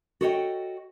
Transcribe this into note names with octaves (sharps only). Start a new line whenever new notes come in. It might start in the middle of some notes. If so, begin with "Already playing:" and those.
F#4 A4 C#5 D#5 E5 G5